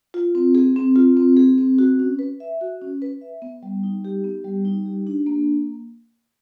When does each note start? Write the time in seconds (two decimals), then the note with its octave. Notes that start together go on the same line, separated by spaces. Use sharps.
0.14 F4
0.35 C4
0.55 G#4
0.76 C4
0.96 F4
1.17 C4
1.37 G#4
1.58 C4
1.79 F#4
1.99 C#4
2.19 B4
2.40 E5
2.61 F#4
2.82 C#4
3.02 B4
3.21 E5
3.42 B3
3.63 G3
3.83 D#4
4.05 G4
4.24 B3
4.44 G3
4.65 D#4
4.86 G4
5.07 D4
5.26 A#3